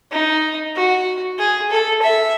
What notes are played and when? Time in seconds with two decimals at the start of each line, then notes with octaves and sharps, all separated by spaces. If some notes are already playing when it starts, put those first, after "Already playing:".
0.12 D#4
0.76 F#4
1.38 G#4
1.71 A4
2.02 E5